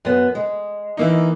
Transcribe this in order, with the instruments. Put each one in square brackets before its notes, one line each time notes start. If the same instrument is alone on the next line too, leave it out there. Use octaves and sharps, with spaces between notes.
[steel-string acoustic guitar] F#2 B3
G#3
[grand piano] E3 A#3 D#4